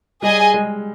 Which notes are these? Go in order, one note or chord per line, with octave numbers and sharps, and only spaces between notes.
G3 G#4 D#5 G#5
G#3